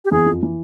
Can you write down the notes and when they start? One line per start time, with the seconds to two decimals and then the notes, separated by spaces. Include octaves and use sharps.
0.05 G4
0.11 E2 E3 G#4
0.26 F2 F3
0.42 E3